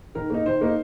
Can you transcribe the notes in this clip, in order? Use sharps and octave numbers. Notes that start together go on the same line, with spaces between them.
D#3 A#4
A#3 D#4
D#3 C5
A#3 D#4